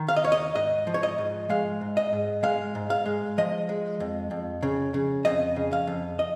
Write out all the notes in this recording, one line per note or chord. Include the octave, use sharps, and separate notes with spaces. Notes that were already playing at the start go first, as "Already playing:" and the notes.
Already playing: D#3
F5
D#5
D#2 C#5
D#5
G#2 D#5
F3
C#5
D#5
G#2
G#3 F5
G#2
D#5
G#2
G#3 F5
G#2
F5
G#3
F3 D#5
G#3
F2
F2
C#3
C#3
F2 D#5
C#3
F5
F2
D#5